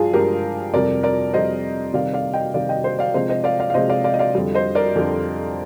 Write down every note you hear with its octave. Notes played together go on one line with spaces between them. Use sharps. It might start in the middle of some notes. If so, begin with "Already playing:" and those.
Already playing: G2 F3 F4 G#4
G2 F3 G#3 G4 A#4
F2 C3 G3 A#4 D5
A#4 D5
F2 C3 G3 C5 D#5
C3 D#3 G3 D5 F5
D5 F5
D#5 G5
C3 D#3 G3 D5 F5
D#5 G5
C5 D#5
D5 F5
C3 F3 G#3 C5 D#5
C5 D#5
D5 F5
D5 F5
F5
C3 F3 G#3 C5 D#5
D5 F5
D5 F5
D#5
D5 F5
F2 D3 G3
C5 D#5
A#4 D5
F2 D3 G3